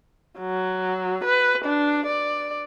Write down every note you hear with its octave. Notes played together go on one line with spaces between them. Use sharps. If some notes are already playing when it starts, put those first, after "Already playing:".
F#3
B4
D4
D5